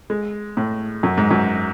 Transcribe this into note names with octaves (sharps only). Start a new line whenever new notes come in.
G#3
A2
F#2
G#2
F#2